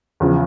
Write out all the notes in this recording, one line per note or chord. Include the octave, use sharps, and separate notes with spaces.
E2 C#3 F3